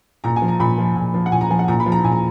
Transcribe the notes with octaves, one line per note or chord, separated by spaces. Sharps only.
A#2 A#5
G#5
F3
A#5
A#2 B5
F3
A#2
F3
F#5
A#2 G#5
A#5
F3 G#5
F#5
A#2 A#5
B5
F3
A#5
A#2 G#5
A#5